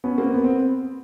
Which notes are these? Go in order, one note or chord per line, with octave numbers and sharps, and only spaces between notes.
B3 C#4
A#3 C4
B3
C4